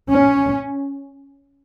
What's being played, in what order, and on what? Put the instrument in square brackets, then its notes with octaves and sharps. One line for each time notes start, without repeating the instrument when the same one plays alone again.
[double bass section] C#4